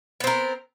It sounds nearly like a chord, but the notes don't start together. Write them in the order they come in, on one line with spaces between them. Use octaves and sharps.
B3 C4 A#4